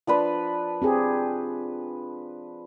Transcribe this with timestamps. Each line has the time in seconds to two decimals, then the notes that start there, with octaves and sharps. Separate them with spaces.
0.07 F3 D4 B4
0.82 C4 G4 G#4